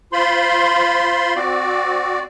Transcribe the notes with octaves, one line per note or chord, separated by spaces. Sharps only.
F4 C5 B5 C6
C4 F#4 D5